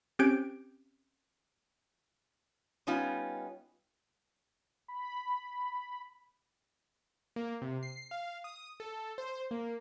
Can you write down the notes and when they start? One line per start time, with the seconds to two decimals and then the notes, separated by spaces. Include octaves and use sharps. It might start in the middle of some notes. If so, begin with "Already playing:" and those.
0.19 C4 C#4 G4 G6 G#6 D7
2.87 G3 B3 C#4 D#4 F4
4.88 B5
7.36 A#3
7.62 C3
7.83 C7
8.11 F5
8.44 D#6
8.80 A4
9.18 C5
9.51 A#3